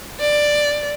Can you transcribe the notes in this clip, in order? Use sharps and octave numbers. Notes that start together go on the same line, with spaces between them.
D5